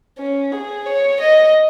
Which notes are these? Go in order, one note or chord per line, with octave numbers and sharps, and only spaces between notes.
C#4
G#4
C#5
D#5